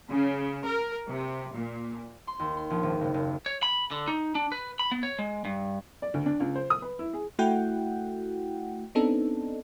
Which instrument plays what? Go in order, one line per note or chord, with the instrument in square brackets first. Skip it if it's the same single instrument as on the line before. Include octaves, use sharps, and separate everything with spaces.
[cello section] C#3
A#4
C3
A#2
[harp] C6
D#2
C6
A#1
G#1
F#1
F#1
[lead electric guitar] C#5
B5
D3
D#4
D4
B4
B5
B3
C#5
G#3
G2
[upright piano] D5
D2
D4
C#2
C5
D#6
B4
E4
G#4
[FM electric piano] A3 E4 F#4 F#5 G5
B3 C4 D4 D#4 A4